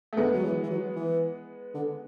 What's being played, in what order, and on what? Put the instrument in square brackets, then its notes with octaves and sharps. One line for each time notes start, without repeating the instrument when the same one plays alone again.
[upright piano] A3
[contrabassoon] D3 [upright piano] G#3 B3
[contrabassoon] F#3
E3
E3
F#3
E3
D3